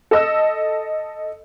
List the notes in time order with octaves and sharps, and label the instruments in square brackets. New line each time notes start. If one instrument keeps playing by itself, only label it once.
[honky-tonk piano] A4 D#5 E6